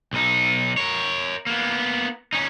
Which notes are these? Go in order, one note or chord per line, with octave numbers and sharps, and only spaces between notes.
B1 D#4
A#4 C#5
A#3 B3
C#4 D#4